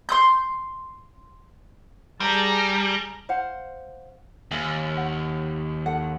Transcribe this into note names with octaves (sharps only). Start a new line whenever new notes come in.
C6 D#6 G6
G3 G#4 A5 A#5
C5 F5 F#5
D#2 A#4 F5 G#5
F#5
A4 F#5